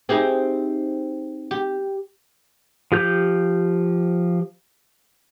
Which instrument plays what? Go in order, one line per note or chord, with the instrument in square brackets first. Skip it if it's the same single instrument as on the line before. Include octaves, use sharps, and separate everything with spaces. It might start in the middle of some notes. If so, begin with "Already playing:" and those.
[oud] C4 D#4 [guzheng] E4 G4 G#4
[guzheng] G4
[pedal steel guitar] F3 G4 G6